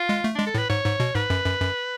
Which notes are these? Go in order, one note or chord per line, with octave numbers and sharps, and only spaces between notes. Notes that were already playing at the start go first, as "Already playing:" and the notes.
Already playing: F4
G#3
A3
G#3 D4
A4
A2 B4
G#2 C#5
G#2
B2
G#2 B4
F#2
F#2
F#2